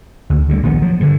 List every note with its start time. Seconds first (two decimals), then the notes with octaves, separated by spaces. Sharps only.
0.30 D2
0.49 D2 E3 G3
0.63 A#1 D#3 B3
0.82 F3 F#3
1.00 G2 D3